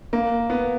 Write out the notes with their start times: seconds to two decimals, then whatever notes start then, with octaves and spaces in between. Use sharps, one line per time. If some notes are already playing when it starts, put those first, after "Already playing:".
0.13 A#3
0.50 B3